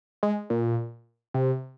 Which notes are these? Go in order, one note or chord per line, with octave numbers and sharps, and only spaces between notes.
G#3
A#2
C3